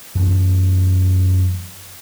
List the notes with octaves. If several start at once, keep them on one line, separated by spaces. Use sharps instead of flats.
F#2 E3 A3